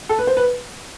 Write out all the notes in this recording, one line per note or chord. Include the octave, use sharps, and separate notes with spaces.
A4
B4
C5
B4